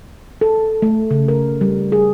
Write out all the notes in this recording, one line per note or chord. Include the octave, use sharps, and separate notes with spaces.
A4
A3
C#3
A#4
G3
G#4